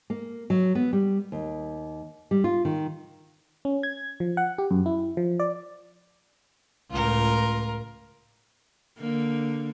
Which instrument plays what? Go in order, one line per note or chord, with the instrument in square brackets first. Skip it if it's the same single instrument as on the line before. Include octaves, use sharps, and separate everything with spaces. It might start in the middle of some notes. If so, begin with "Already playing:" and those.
[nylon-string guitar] A#3
F#3
B3
G3
D#2
G3
F4
D#3
[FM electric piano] C#4
G#6
F3
F#5
G4
F#2
E4
F3
D5
[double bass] C#2 A2 [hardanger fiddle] F4 A#4
[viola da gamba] D3 A#3